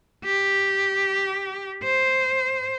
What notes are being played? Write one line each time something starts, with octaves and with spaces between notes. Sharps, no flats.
G4
C5